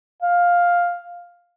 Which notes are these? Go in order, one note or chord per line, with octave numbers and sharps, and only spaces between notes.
F5